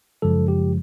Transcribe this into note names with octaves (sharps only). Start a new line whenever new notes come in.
F#2 C#3 F3 G#3 A4
G4